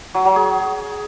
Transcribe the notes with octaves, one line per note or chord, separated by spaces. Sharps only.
F#3
F#3
G#4